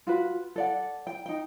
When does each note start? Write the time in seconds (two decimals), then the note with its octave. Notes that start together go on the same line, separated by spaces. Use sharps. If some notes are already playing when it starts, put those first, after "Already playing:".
0.07 F4 F#4 B4
0.56 A4 D5 F#5
1.07 G5
1.26 D#4 G5